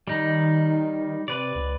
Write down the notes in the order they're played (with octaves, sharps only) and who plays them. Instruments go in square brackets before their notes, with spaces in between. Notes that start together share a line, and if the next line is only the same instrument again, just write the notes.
[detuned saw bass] D#3 [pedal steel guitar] G3 D#4
[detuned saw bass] C3 [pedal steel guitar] B4 D5
[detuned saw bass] C#2